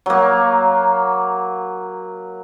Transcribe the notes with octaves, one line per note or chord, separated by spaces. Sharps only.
F#3 A#3